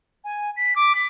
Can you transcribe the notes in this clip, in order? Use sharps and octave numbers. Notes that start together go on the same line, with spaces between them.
G#5
B6
D6
B6